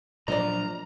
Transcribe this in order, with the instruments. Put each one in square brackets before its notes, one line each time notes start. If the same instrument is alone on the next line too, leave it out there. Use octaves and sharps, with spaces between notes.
[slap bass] A#2 F3 [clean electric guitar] F#3 A#3 D4 [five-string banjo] D5 D#5 [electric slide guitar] A#5